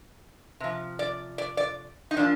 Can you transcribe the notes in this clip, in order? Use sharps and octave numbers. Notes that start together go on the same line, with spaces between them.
C3 F3
D5
D5
D5
D#4
A#2 F3 D4